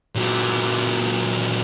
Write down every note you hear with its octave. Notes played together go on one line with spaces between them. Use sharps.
A#2 F#3